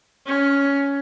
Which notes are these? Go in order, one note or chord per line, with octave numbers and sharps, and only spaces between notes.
C#4